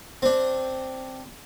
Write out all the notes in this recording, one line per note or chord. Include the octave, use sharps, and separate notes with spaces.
C4 D4